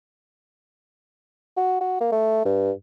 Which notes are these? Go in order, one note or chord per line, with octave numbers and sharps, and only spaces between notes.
F#4
F#4
A#3
A3
G2